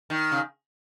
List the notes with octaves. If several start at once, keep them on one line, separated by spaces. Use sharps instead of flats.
D#3
C#3